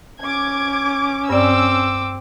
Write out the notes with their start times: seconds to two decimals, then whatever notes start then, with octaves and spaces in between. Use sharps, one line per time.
0.21 C#4 D6 G#6
1.30 G2 C4 D5 D6 E6